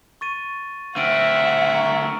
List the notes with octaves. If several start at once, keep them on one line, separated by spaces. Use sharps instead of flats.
C#6 A6 D#7
D2 C4 E5 F#5 F6 D7 D#7
A#5 C#6